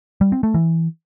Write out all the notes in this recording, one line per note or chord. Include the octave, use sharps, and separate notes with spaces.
G3
C4
A3
E3